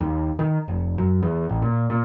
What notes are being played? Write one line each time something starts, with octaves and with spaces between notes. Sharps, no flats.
D#2
D#3
F1
F#2
E2
A1
A#2
A#2